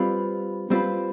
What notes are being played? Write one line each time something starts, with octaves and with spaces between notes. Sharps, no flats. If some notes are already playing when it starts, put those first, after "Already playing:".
Already playing: G3 C4 F4 B4
G3 C4 F4 B4